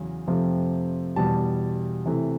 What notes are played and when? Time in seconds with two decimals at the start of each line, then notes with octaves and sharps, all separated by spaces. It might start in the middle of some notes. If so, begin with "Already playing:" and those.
Already playing: E2 C#3 F#3
0.27 F2 C3 F3 A3
1.16 E2 B2 G3 A5
2.06 C3 E3 A3